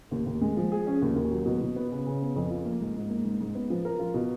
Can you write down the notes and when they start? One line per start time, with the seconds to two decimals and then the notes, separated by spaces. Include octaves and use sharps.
0.11 D#2
0.26 D#2
0.41 G#3
0.57 F3
0.72 G#4
0.87 C#4
1.02 D#2
1.16 D#2
1.31 F#3
1.46 B2
1.61 B2
1.76 B3
1.91 C#3
2.06 C#3
2.21 B3
2.36 F2
2.50 F4
2.65 A#3
2.80 G#2
2.96 G#2
3.10 A#3
3.25 G#2
3.41 G#2
3.55 B3
3.70 F3
3.85 A#4
3.99 F4
4.14 B2